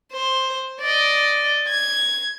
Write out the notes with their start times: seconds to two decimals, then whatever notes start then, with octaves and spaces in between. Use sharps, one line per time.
0.12 C5
0.80 D5 D#5
1.69 G#6